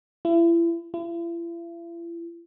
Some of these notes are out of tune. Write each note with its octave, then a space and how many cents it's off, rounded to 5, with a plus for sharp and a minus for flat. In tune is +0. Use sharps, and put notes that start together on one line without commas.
E4 +35
E4 +45